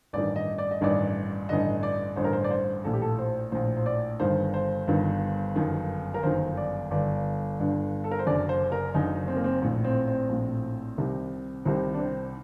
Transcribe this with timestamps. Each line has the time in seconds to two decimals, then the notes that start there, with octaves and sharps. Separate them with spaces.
0.13 A1 G2 D#3 D5
0.36 D#5
0.58 D5
0.71 D#5
0.81 A1 G2 D#3 D5
1.49 A1 G2 D3 D#5
1.83 D5
2.16 A1 G2 D3 C5
2.24 A#4
2.33 C5
2.44 D5
2.51 C5
2.84 A#1 A2 A4
2.93 G4
3.02 A4
3.19 C5
3.52 A#1 A2 C5
3.77 C5
3.86 D5
4.20 G1 G2 D#3 C5
4.54 C5
4.88 G1 G2 D#3
5.56 G1 F#2 D#3
6.14 A#4
6.23 G1 F#2 D#3 C5
6.57 D5
6.91 G1 G2 D3 D5
7.59 G1 G2 D3
8.04 A4
8.11 A#4
8.19 C5
8.27 F#1 F#2 D3 D5
8.49 C5
8.72 A#4
8.94 F#1 F#2 D3 D#4
9.28 C4
9.36 A#3
9.44 C4
9.62 A#1 A2
9.84 C4
10.08 C4
10.29 A#1 A2
10.98 C2 C3 D#3
11.65 C2 C3 D#3 C4
11.94 D4
11.99 C4